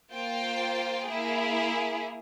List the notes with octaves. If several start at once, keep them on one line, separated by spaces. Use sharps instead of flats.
A#3 F4 C5 G5
A#3 E4 G#4